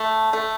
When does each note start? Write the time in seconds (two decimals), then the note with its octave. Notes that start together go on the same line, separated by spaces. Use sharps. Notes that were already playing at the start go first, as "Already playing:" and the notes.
Already playing: A3
0.33 A3